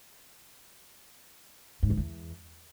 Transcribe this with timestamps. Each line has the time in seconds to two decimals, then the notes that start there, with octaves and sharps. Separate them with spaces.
1.83 G#2
1.90 F2
1.97 E2